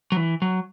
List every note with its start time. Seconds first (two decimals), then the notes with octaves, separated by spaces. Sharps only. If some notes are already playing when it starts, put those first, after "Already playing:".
0.12 F#3
0.17 E3
0.42 F#3